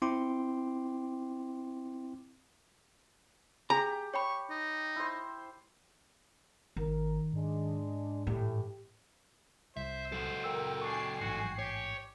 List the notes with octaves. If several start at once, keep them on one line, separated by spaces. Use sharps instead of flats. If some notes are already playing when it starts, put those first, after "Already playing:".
C4 E4 G5 C6 D6
G4 G#4 G#5 A#5
C#5 G5 B5 C#6
D#4
E4 C5
G#1 D#3 A#4
G#2 G#3 D4
A2 E3 G4
C2 C5 E5
F#3 A4
A#4 G5 E6
D4 G5 G#5 C#6 C7
A1 G#2 F#4
G4 C#5